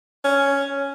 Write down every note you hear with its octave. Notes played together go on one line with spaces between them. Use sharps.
C#4